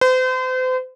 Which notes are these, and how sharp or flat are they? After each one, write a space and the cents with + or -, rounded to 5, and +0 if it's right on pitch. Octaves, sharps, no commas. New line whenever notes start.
C5 -40